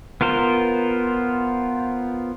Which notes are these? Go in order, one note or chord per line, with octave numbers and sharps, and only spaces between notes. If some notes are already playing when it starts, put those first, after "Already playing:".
B3 F4 A#4 C5